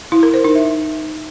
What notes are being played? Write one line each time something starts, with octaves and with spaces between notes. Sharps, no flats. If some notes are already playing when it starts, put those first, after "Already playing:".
E4
A#4
C5
D#4
E5